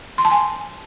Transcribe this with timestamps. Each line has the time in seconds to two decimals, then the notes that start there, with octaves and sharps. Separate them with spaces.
0.18 C6
0.25 A5
0.31 G#5